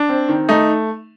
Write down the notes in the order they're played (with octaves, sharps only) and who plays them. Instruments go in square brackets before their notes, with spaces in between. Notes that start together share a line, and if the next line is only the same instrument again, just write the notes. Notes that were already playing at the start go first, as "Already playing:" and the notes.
Already playing: [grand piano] D4
C4
D#3
A3 D#4